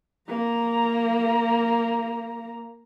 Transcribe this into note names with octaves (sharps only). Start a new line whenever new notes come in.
A#3 A#5